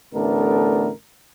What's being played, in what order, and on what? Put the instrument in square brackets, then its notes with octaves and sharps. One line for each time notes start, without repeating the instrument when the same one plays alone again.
[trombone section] A1 D3 A3 B3 D4 A#4